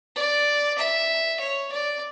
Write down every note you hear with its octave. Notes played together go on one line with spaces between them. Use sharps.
D5
E5
C#5
D5